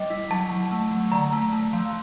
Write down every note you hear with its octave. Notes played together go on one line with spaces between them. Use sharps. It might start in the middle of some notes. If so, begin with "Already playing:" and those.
Already playing: G3 D#5
E4
F#3 A5
F#3
A3
F#3
D3 A#5
A3
A3
F3